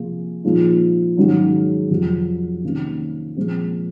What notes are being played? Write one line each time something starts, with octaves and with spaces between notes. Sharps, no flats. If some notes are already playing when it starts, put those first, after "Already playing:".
Already playing: C3 F3 A#3 F4 G#4
A#2 F3 G#3 D#4
G#2 D#3 F#3 C#4
F2 C3 F#3
C3 D#3 A#3 C#4
A#2 F3 G#3 C4